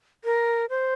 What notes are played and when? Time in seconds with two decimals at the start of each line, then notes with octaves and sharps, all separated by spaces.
0.25 A#4
0.70 C5